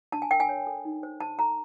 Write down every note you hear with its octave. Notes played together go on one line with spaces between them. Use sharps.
D4 A5
G#5
A#4 G5
G#5
C#5
A4
D#4
C5
C5 A5
A4 A#5